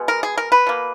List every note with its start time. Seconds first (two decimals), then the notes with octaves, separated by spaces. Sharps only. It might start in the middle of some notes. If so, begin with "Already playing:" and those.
Already playing: B2 G#3 B3
0.08 A#4
0.23 G#4
0.38 A#4
0.52 B4
0.67 B2 A#3